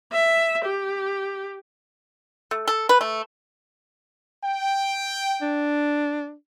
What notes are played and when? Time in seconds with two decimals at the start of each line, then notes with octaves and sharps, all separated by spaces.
0.13 E5
0.65 G4
2.51 A3
2.67 A4
2.89 B4
3.01 A3
4.43 G5
5.42 D4